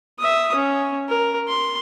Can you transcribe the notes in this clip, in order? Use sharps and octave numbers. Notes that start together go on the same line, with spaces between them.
E5 D#6
C#4
A#4
C6